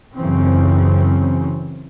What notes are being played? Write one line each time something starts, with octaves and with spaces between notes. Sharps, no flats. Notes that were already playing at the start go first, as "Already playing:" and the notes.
F#2 C#3 E3 C4 C#4